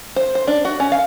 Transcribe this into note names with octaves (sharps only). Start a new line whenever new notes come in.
C5
C5
D4
F#4
C#4
F5